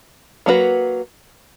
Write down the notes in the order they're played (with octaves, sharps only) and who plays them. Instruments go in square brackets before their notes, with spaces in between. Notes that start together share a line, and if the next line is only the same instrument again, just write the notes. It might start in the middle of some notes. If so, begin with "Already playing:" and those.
[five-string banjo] F#3 A#3 D4 F#4 B4